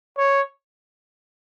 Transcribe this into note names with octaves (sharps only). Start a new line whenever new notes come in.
C#5